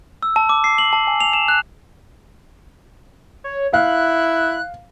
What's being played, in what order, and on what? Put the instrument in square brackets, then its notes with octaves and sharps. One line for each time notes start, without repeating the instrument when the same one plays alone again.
[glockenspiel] E6
A5
D6
C7
F#7
A5
G#5
F7
E7
F#6
[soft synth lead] C#5
[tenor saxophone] E4 [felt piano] F5 [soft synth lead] F#6